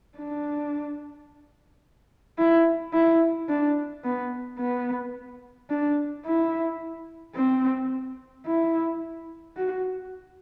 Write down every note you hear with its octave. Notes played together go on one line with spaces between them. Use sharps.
D4
E4
E4
D4
B3
B3
D4
E4
C4
E4
F#4